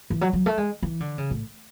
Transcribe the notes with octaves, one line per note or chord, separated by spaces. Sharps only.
E3
F#3
F#3
A3
G#3
E3
D3
C#3
A2